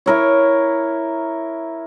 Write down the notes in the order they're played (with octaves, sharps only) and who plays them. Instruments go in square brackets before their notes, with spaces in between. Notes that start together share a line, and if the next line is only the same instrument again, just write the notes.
[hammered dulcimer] E4 A#4 C#5